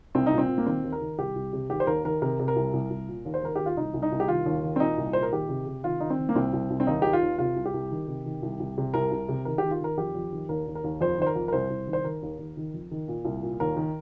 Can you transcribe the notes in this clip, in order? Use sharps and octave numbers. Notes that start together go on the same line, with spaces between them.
C2 C4
D#4
A#2
C4
A#2
A#3
D#3 C4
D#2
A#4
D#3
C2 G4
C2
C3
D#2 G4
C5
D#2 A#4
D#3 A#4
C3 A#4
C3
A#4
C2
C2
C2
A#2
D#2
C5
D#3 A#4
D#2 G4
F4
C2 D#4
C2
D#4
C2
G4
D#3 F4
D#2
D#3
C4
A#2 D#4
C2
A#2 C5
A#4
D#3 G4
C3
C3
D#3 F4
D#3 D#4
C4
D#3
A#3
C2 C4
C2
C2
C4
D#2 D#4
D#3 G4
F4
D#2
C3 F4
C2
G4
C2
D#3
C3
D#3
C2
C2
C3
C2 A#4
C2
C3
D#3 A#4
G4
D#3
F4
D#3 A#4
F2 G4
F2
D#3
D#2 A#4
D#2
A#4
D#2
F2 C5
D#3 C5
A#4
F2
A#4
C2 C5
C2
D#3
C5
D#3 A#4
D#2
D#2
D#3
F2
D#3
A#2
C2
A#2
D#2 A#4
D#3